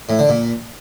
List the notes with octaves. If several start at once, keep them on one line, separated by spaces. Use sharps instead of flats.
A2
D3
A#2